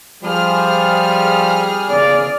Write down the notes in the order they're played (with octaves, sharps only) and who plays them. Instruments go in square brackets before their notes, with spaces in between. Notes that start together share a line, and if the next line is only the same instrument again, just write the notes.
[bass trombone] F3 [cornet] G3 [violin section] G#4 F6
[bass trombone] C#3 [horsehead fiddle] D5